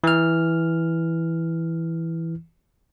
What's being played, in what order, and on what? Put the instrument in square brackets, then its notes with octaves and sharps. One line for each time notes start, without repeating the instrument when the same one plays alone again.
[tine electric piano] E3 F6